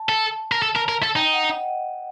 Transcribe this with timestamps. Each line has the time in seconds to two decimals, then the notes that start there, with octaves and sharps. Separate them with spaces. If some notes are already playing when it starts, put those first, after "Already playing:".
Already playing: A5
0.09 A4
0.52 A#4
0.62 A4
0.76 A#4
0.89 A#4
1.03 A4
1.16 D#4 G5
1.33 F#5
1.51 D#5